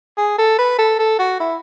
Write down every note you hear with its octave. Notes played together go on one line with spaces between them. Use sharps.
G#4
A4
B4
A4
A4
F#4
E4